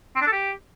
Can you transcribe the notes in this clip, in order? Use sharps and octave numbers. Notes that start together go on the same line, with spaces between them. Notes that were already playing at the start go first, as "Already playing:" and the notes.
C4
D4
A4
G4